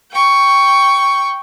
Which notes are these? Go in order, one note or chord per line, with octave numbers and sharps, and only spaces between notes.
G5 C#6